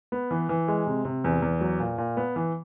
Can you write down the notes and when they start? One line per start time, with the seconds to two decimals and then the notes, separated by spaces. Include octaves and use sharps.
0.12 B3
0.31 E3
0.49 E3
0.68 G#3
0.87 C3
1.05 C3
1.24 E2
1.42 E2
1.61 F#3
1.80 A#2
1.98 A#2
2.17 B3
2.36 E3